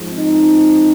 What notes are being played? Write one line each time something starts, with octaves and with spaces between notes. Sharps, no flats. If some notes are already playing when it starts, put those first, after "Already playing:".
Already playing: G#2 F3
C4 D#4